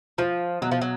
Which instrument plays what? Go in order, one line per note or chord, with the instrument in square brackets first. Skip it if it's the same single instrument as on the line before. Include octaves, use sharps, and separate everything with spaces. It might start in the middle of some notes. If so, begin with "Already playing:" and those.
[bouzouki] F3 [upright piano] F4
[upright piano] B2 [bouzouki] F#3
[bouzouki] F3
F#3